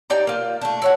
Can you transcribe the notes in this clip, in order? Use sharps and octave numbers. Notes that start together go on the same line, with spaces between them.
D#4 G4 D5 A#5
A#3 F4
A3 D4
E4 C#5 F#5